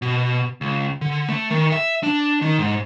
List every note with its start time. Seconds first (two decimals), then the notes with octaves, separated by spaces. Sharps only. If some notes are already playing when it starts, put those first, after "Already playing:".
0.02 B2
0.61 C#2
1.01 D3
1.28 A3
1.50 D#3
1.72 E5
2.03 D4
2.42 D#3
2.59 G#2